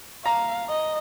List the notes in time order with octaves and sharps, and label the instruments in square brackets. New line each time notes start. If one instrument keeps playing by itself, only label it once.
[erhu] F5 [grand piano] A#5
[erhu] D#5